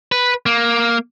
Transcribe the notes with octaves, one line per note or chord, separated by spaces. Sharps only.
B4
A#3